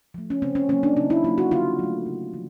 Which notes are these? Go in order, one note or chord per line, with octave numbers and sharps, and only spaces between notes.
F3 A3
C#4
C#3 C4
C#4
F#3 A#3 C#4
D4
C#3 D#4
E4
F#3 A#3 F4
F#4
D3 F4
F#3 A3
C#3
F3